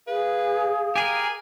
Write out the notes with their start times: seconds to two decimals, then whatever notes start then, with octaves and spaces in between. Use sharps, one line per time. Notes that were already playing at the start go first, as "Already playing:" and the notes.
0.07 G#4 B4 F5
0.96 G4 G#4 A#4 G#5